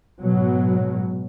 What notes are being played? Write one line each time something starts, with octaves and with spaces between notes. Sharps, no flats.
G#2 B2 F#3